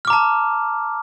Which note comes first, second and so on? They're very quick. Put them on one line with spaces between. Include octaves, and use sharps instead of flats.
F6 D6 A#5 A5